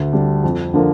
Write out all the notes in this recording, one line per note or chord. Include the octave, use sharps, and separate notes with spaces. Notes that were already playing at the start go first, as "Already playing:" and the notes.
Already playing: D2
D3 G3 D4
F2
D3 F3 A#3 D4